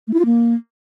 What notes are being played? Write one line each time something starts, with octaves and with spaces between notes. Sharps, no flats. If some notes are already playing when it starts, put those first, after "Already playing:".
A3
E4
F4
A#3